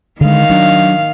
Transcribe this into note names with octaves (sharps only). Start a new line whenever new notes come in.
D3 D#3 G#3 F5
F#3 D4